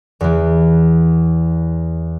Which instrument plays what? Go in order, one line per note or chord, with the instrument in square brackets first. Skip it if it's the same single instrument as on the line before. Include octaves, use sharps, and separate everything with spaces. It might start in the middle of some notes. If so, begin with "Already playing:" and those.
[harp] E2 E3